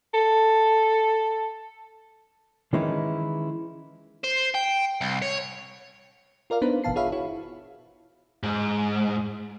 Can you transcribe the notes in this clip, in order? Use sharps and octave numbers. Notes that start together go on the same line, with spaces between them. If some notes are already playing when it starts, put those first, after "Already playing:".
A4
D#3 E3 G#3 C#4 D#4 E4
C5
G5
C2
C#5
F4 A#4 D5 F5
B3 D4 D#4 B4 C5
G1 B2 E3 F5 A5 C7
F4 G#4 C#5 E5 F5 B5
E4 F#4 C#5
G#2